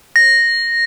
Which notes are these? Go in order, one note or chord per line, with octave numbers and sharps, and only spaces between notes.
A#6